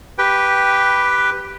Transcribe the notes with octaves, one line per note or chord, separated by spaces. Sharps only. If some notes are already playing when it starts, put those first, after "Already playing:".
G4 B4 G5